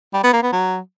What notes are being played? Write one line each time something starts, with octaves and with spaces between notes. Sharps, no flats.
G3
B3
A#3
B3
F#3